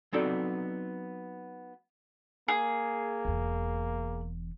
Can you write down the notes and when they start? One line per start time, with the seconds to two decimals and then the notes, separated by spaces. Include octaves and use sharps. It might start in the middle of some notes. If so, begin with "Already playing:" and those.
0.13 F#3 B3 C4 D#4 A4 D5
2.48 A#3 G#4
3.25 E1 E2